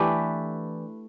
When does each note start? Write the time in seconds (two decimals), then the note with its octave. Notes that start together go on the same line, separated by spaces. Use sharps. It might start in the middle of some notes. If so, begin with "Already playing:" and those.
Already playing: E3 A3 D4 G4 A4 B4